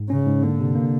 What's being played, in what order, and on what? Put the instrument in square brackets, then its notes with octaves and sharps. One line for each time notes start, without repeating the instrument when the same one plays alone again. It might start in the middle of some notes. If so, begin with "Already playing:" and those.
Already playing: [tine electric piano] G#2
[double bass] C#3 [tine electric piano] C#4
[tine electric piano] G#2
[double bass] D3 [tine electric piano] A#3
[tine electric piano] C3
A#3